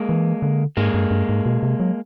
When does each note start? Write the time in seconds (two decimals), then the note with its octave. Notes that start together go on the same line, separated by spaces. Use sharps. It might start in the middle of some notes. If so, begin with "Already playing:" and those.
Already playing: G#3 A#3
0.09 E3
0.42 D3
0.77 G#2 G#3 A#3
0.94 G2
1.11 G2
1.29 G#2
1.46 B2
1.63 C3
1.80 F#3